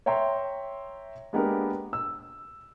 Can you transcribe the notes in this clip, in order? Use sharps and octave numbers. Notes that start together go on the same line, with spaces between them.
C#5 E5 G5 A#5 C6
G#3 A#3 B3 D4 G4 A#4
E6